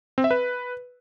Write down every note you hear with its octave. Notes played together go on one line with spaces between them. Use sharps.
C4
E5
B4